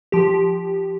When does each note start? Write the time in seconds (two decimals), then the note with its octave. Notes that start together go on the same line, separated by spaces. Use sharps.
0.12 F3 G4